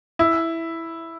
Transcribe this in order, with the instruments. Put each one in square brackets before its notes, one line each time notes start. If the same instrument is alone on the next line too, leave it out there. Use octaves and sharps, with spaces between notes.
[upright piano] E4